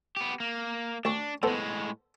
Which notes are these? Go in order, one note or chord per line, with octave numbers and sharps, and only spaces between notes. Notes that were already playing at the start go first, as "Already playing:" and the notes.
B3 G4
A#3
D2 D4 C#6
A2 G#3 B3 A4 C5